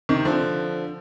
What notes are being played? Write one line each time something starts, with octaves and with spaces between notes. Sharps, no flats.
C3 D#3
D3 F3